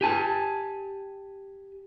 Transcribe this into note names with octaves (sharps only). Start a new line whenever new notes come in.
G4 G#5 A5